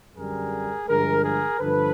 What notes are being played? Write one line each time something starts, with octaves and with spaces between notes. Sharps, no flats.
F#2 D3 G3 G#4 A#4
G2 D3 F3 G#3 G#4 A#4
G#4 A#4
G2 D3 F3 A4 B4